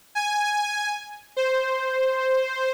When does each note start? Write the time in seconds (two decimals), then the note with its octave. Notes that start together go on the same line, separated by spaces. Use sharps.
0.15 G#5
1.37 C5